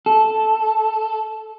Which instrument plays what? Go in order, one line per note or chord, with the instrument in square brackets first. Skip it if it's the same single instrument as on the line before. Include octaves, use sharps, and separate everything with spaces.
[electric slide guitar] A4